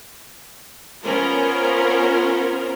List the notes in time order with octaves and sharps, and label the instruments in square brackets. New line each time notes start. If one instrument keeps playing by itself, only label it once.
[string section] B3 C#4 F4 A#4 C5